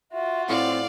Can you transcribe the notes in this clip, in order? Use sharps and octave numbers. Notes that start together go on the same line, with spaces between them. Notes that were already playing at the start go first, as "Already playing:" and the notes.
F4 F#4 E5
A2 C4 D5 F5 F#5